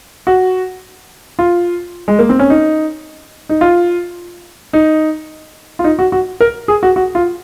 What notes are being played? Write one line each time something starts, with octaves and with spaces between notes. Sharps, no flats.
F#4
F4
G#3
A#3
C4
C#4
D#4
D#4
F4
D#4
F4
D#4
F#4
F#4
A#4
G#4
F#4
F#4
F4